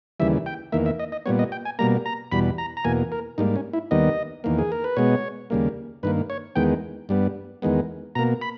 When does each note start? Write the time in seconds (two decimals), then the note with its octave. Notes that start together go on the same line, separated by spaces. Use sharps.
0.20 D#2 C#3 E3 G3 E5
0.46 G5
0.72 E2 D#3 A#3 E5
0.86 E5
1.00 D#5
1.12 D#5
1.26 A#2 G3 B3 C#5
1.39 D#5
1.52 G5
1.65 G#5
1.79 B2 G3 A#3 A#5
2.06 A#5
2.32 E2 B2 G3 B5
2.58 A#5
2.77 A#5
2.85 E2 B2 A#3 G#5
3.12 A#4
3.38 G#2 G3 A#3 D#4
3.56 C#4
3.73 E4
3.91 D#2 D#3 G3 B3 D#5
4.44 E2 D#3 A#3
4.58 G#4
4.72 A#4
4.84 B4
4.97 B2 G#3 B3 C#5
5.50 D#2 C#3 G3 A#3
6.03 G2 D#3 A#3 B4
6.30 C#5
6.56 E2 D#3 G#3 B3 G5
7.09 G2 G3 B3
7.62 E2 D#3 G#3 B3
8.15 B2 A#3 A#5
8.42 B5